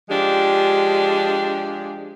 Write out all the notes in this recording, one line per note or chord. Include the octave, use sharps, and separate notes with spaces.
F3 G#3 D4 G4